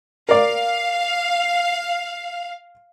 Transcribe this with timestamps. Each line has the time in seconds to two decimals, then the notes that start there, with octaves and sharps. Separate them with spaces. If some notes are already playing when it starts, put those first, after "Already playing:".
0.29 A#4 D5 F5